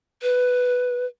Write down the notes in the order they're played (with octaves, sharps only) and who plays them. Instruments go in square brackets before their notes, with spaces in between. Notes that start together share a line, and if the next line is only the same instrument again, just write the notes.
[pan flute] B4